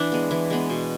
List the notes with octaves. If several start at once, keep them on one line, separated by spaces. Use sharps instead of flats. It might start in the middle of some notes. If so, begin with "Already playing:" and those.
Already playing: E3 D4
G#3 B3
E3
G#3 B3
B2